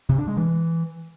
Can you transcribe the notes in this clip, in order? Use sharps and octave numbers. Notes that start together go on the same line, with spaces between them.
C3
D4
G#3
E3